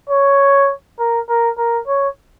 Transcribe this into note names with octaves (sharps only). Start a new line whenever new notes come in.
C#5
A#4
A#4
A#4
C#5